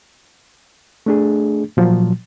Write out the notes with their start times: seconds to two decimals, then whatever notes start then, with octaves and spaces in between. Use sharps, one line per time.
1.06 A3 D4 G#4
1.77 A#2 F3 F#3